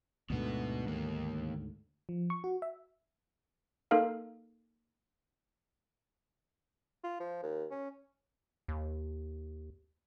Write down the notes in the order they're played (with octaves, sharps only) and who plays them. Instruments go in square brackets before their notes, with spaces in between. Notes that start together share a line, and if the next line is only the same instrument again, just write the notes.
[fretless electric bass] D2 G#2 D3 [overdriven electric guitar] B2 B3
[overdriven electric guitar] D#2 A#3
[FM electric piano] F3
C#6
F#4
E5
[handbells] A#3 D#4 A4 A#4 F5
[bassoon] F4
F3
D#2
C#4
[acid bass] D#2